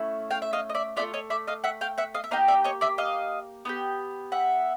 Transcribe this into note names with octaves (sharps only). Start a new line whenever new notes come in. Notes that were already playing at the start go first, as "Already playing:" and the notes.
Already playing: A3 C#4 E4
F5 G5
E5
D#5 F5
D#5
D5 E5
A3 D4 F4 D5 E5
C#5 D#5
D5 E5
D#5 F5
E5 F#5
F5 G5
E5 F#5
D#5 F5
E5
A#3 D#4 G4 D#5 F5
D5 E5
C#5 D#5
D5 E5
D#5 F5
B3 D#4 G4
E5 F#5